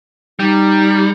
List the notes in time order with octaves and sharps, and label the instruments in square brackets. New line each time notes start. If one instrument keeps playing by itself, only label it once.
[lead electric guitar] G3 [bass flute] D#4